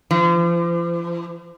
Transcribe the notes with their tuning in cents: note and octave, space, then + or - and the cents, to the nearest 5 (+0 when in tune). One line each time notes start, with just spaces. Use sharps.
F3 -40